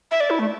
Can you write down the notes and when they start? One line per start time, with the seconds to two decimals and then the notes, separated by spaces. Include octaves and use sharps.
0.11 E5
0.20 D5
0.30 E4
0.39 A3